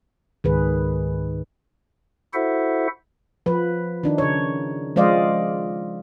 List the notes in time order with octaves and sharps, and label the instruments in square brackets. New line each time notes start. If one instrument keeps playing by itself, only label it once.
[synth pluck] C#2 G#2 [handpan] D#3 G#4 B4
[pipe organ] E4 F#4 A4 C5 E5 F#5
[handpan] F3 B4
D#3 D4 D#4
C#3 C#5
F3 G#3 C5 D5 D#5 F5